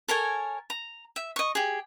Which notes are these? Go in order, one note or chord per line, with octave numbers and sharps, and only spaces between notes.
A4 A#4 C#5 G#5
A#5
E5
D#5 C#6
G4 G#4